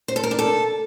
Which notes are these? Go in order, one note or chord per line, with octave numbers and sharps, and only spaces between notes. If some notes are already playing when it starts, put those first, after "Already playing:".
C5
A4
A#4
D4
A4